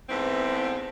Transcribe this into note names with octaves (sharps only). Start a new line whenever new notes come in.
E2 G#2 E3 A3 C4